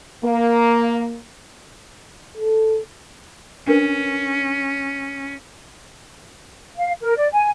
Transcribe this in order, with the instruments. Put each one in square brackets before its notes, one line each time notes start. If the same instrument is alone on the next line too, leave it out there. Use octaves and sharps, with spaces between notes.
[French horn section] A#3
[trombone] A4
[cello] C#4 [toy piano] D4 A#4 B4
[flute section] F5
A#4
D5
G#5